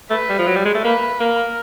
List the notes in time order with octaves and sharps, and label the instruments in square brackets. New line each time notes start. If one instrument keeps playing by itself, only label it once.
[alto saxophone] A3 [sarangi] B4
[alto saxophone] G3
F3
F#3
G3
G#3
A3
[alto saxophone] A#3 [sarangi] B4
[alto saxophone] A#3 [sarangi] A#4